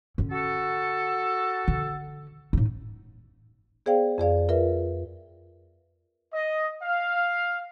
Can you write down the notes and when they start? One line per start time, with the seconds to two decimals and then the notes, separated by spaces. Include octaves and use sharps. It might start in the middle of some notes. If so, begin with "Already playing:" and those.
0.18 D3 C#4
0.31 F#4 A4
1.68 D3
2.53 A2 D#4
3.86 B3 G#4 C5 D5 F5 G5
4.18 F2 G#4 D5 F5
4.49 F4 A#4 B4 E5
6.33 D#5
6.82 F5